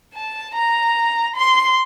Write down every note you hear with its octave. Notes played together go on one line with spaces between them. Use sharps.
A5
A#5
C6